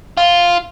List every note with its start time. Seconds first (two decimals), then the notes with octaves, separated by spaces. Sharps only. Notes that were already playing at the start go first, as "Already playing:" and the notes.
0.18 F4